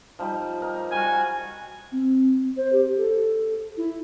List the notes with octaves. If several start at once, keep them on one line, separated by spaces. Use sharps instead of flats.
F3 G3 D#4
A#4 D#5
G3 F#4 G#5
C4
C5
G4
A4
E4